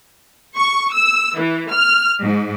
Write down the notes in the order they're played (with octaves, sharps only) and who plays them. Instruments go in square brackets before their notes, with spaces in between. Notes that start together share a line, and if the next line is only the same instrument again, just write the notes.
[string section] C#6
E6
E3
F6
G#2